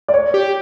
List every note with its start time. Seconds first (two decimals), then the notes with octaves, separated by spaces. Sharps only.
0.08 D5
0.14 C#5
0.34 G4